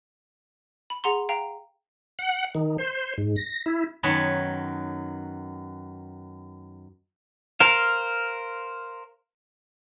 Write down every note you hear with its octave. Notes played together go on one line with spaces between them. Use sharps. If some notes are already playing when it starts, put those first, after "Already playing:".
B5
G#4 F#5 A#5 C6
F5 G5 A#5
F#5
D#3
C5
G#2
A#6
E4
F#2 D#3 B3 B4 C#5 A5
A#4 C5 F5